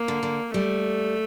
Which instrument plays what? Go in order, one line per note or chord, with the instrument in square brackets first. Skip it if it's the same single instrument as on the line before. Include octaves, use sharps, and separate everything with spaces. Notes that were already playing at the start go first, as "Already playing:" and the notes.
Already playing: [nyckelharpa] A#3
[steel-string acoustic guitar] D3
D3
[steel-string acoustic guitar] G3 [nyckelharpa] A3